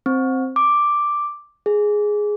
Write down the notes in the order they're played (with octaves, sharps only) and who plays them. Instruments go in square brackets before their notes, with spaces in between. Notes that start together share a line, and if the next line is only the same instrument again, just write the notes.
[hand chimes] C4
D6
G#4